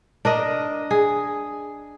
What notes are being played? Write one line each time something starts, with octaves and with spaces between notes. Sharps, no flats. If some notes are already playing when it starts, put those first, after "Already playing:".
D4 A#4 D#5
G#4